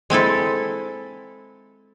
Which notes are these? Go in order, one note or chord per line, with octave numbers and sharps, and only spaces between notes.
G#3 C4 E4 A4